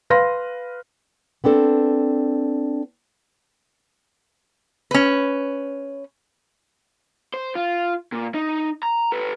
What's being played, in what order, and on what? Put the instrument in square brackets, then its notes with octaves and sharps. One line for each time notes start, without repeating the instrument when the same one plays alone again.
[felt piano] B4 F5 C6 A#6
[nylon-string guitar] B3 C4 D4 A4
[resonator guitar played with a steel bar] C#4 B4
[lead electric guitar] C5
F4
A#2
D#4
A#5
A4 B4